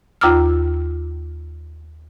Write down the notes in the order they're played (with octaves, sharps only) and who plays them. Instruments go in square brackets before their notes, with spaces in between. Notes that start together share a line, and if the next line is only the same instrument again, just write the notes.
[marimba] D#2 F4 A#5 D6 E6 F6